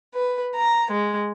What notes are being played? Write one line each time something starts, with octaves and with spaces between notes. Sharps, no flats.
B4
A#5
G#3